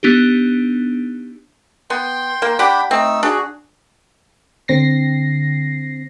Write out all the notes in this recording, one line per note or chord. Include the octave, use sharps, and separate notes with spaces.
B3 D4 D#4 G4
B3 G5 C6
A#3
D4 G4 F#5 G5 B5
A3 C4 D#4 E6
D4 F#4 G#4
D3 C4 A#6 C7